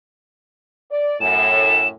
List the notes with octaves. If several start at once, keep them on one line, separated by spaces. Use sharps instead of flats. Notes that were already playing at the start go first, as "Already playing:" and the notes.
D5
F#2 A2 E7